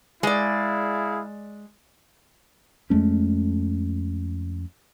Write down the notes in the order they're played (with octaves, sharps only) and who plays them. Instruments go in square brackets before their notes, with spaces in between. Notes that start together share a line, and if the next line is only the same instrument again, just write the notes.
[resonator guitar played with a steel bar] G#3 D5 [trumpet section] E4 G#4 F5
[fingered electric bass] F2 G#3 A3 C#4